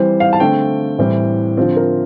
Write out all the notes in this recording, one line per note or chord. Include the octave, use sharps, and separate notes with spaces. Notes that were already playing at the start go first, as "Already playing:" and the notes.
Already playing: E3 G3 C4 C5
F5
A5
D3 A3 C4 G5
A2 E3 G3 C4
D3 F3 C4
A#4